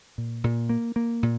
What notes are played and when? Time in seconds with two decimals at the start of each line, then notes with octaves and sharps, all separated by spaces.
0.18 A#2
0.44 A#2
0.69 A#3
0.96 A#3
1.23 A#2